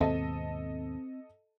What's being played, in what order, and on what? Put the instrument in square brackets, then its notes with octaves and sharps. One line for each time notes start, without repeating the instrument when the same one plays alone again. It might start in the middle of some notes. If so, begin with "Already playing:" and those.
[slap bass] D#2 G#2 B2 [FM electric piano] C4 [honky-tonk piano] A4 D#5 A5